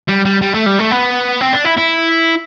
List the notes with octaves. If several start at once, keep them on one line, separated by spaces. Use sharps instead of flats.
G3
G3
G3
A3
G3
A3
B3
C4
D4
E4
E4